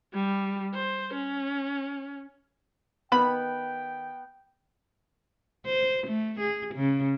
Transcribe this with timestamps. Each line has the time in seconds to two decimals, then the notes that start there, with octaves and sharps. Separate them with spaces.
0.13 G3
0.74 C5
1.14 C#4
3.12 D#3 B3 G5 B5
5.66 C5
6.07 A3
6.40 G#4
6.75 C#3